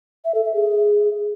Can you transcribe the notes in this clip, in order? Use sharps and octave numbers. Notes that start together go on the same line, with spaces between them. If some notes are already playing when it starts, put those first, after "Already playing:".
E5
A4
E5
G#4